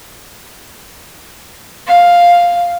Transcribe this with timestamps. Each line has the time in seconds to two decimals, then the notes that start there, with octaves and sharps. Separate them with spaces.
1.86 F5